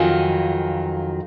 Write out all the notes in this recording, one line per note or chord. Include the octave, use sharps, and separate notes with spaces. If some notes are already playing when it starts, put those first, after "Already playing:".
Already playing: F2 D#3 F#3 F5 G#5